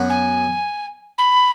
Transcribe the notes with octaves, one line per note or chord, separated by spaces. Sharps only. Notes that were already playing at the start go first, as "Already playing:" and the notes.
Already playing: F#2 F#3 B3 F#4
G#5
B5